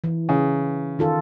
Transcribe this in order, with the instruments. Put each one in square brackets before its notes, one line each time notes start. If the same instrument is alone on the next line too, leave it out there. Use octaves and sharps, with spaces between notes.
[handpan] E3
[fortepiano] C#3
[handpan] D#3 F4 A4